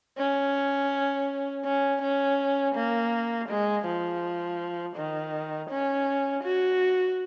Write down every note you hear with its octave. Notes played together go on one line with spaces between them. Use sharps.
C#4
C#4
C#4
A#3
G#3
F3
D#3
C#4
F#4